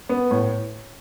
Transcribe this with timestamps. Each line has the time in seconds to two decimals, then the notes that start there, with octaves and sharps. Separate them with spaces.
0.09 B3
0.31 A2